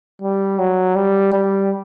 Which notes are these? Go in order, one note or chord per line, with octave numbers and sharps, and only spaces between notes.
G3
F#3
G3
G3